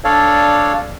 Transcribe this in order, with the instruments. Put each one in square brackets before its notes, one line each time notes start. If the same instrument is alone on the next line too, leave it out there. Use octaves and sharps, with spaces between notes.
[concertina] D4 A4 C#5 D5 F5